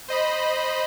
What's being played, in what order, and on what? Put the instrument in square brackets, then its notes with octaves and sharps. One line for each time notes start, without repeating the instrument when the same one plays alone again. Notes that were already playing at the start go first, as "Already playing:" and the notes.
[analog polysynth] C5 D#5 B5